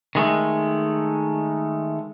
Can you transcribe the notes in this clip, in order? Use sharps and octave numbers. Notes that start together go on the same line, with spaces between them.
D#3 G#3 A3